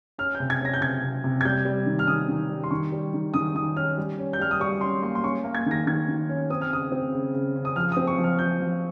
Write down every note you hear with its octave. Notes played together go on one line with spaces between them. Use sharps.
C#4 F6
G6
C3
G#6
C#4 A#6
G6
C3 G#6
C3
C3
G#6
G3 G6
G3
D#3
F6
D#3 D#6
D#3
G3
C6
D#3 C#6
G3
D#3
D#3 D#6
D#3 D#6
C#4 F6
G3
C#4
G6
G3 F6
D#6
G3 C#6
C#4 C6
A#3 C6
C6
C#4 C#6
A#3
G#6
D#3 A#6
D#3 G#6
D#3
C#4
C4 D#6
F6
C#3 D#6
C4
C#3
C#3
C#3
D#6
F3 F6
D#6
C4
C#6
F3
F6
F3 G6
F3